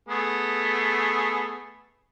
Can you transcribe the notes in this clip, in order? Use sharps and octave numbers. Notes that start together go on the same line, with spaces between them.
A3 B3 G#4